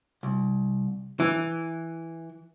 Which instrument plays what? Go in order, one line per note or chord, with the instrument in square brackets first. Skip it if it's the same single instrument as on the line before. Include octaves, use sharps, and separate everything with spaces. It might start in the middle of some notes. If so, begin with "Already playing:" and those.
[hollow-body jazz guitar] C2
E3